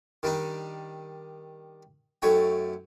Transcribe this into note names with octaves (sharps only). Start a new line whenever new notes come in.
D#3 G3 D4 D#4
F#2 A3 D#4 C#5 G5